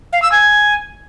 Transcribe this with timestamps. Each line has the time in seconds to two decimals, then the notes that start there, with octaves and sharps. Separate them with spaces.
0.13 F5
0.22 E6
0.32 G#5